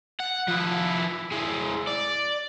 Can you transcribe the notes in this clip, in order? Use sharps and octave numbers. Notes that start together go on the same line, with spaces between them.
F#5
F3 E4
G#3 E4
D5